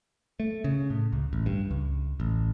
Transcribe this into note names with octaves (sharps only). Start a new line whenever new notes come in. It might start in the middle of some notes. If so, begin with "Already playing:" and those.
A3
C#3
A2
C#2
A1
G2
C#2
A1